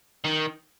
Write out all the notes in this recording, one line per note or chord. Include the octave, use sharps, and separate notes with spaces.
D#3